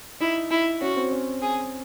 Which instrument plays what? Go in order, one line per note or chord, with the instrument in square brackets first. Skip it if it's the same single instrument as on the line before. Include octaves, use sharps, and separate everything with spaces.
[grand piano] D#4 [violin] E4
[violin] E4
[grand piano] C#4 [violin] F#4
[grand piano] C4
C#4
[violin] G#4